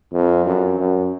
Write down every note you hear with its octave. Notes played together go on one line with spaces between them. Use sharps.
F2
F#2
F#2